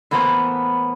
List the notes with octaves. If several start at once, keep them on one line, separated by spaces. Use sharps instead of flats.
A2 E3 A#3 B3 C5 A#5